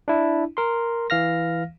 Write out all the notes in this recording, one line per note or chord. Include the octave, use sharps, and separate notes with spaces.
D4 E4
A#4 C6
E3 F5 F6 A#6